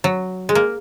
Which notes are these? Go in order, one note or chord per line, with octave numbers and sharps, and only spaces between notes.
F#3
G#3
A#3